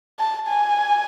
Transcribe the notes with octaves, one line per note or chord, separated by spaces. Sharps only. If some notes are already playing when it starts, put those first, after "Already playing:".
A5
G#5